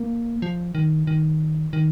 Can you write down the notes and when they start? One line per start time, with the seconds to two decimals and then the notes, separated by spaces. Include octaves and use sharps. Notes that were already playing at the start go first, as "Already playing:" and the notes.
Already playing: A#3
0.42 F3
0.75 D#3
1.07 D#3
1.73 D#3